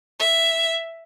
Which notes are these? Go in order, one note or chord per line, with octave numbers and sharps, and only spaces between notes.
E5